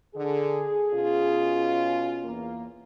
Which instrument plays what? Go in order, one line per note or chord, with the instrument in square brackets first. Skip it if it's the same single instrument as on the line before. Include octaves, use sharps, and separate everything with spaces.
[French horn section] D3 [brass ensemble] G#4
[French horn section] B2 C#4 F4
[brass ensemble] E2 A#3